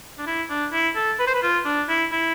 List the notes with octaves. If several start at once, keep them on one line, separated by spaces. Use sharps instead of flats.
D4
E4
D4
E4
A4
B4
C5
B4
F4
D4
E4
E4